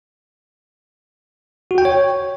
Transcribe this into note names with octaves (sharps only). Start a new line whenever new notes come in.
F#4
G5
C#5